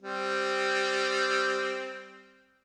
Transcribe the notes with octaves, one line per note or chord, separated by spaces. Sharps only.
G3 C4